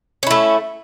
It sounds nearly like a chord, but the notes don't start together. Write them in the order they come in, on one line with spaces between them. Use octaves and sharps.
C#4 E4 A3